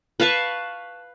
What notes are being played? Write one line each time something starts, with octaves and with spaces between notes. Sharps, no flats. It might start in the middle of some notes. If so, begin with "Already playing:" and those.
B4 F5 A5 C#6